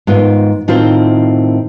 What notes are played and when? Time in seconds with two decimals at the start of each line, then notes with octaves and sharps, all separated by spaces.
0.07 G#2 D#3 B3 F4
0.68 A2 D#3 C4 F4 A#4 C5